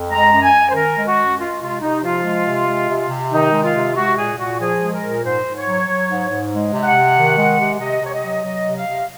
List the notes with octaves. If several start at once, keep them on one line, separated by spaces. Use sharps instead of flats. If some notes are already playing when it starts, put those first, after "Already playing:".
Already playing: F2
G#3 A#5
F#2
G#5
F#2
C5
D#3 A#4
G#3
F#4
F#2
G#3 F4
C3 F4
C3 D#4
F3 F4
G#3
C3
G#3
C3
C3
D#3 D#4
G#3
F4
C3
G#3 F#4
A#2 G#4
A#2 F#4
F3 G#4
G#3
A#4
A#2
G#2 C5
G#2
C#5
F#3
F#3
G#2
G#2
G#3
C3
F#5
C3
D#3
G#3
C3
C3 D#5
C3 C#5
D#5
F#3
F#3 D#5
C3
F5
C3